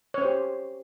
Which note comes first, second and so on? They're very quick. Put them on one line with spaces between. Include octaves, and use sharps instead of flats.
C#5 C#4 C5 G4